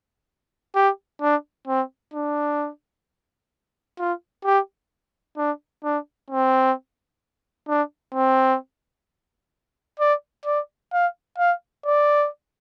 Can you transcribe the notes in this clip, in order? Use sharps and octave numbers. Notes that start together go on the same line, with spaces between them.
G4
D4
C4
D4
F4
G4
D4
D4
C4
D4
C4
D5
D5
F5
F5
D5